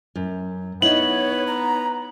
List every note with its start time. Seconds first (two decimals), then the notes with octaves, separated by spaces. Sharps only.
0.16 F#2
0.82 B3 D#4 E4 C#5 F#7
1.47 A#5